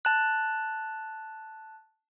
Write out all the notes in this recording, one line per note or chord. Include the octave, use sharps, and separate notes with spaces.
A5 F#6